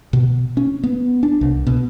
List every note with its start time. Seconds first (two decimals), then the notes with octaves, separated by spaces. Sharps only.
0.13 B2
0.57 C#4
0.84 B3
1.23 D4
1.41 C2
1.67 B2